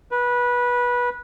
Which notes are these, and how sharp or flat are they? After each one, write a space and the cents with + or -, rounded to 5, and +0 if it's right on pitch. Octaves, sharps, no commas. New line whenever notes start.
B4 -20